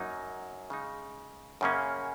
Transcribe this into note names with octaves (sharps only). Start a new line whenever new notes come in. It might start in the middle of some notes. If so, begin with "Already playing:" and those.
Already playing: F#2 F#3 A#3 D#4
C#3 G#3 D#4
F#2 C#3 A#3 C#4